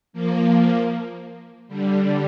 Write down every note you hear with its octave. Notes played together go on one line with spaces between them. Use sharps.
F3 A#3
D3 G3